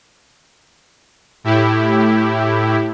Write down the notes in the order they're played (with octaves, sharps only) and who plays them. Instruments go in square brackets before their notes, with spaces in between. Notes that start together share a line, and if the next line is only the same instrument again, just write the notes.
[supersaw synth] A2 E4 G4